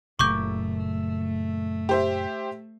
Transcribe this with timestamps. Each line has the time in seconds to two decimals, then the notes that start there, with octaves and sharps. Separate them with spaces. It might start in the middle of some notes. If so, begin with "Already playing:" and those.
0.19 F#1 A#2 C#3 A3 C#6 D6 G6
1.89 G4 C5 E5